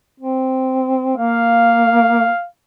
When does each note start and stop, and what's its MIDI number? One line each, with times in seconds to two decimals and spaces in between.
0.20 1.13 60
1.17 2.28 58
1.17 2.47 77